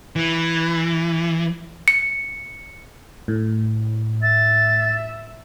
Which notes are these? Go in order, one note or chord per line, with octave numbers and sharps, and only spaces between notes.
E3
C#7
A2
E5 A6